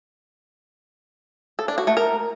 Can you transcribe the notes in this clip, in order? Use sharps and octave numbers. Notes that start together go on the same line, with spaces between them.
A4
D4
F#4
A3
A#4